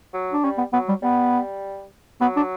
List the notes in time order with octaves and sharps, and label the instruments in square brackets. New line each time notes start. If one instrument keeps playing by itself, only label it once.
[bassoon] F#3
[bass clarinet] D4
[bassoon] G3 [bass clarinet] C#4
[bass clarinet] B3
[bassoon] F#3 [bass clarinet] B3
[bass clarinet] G3
[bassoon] G3 [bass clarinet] B3
[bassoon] F#3 [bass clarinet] B3
[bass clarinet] D4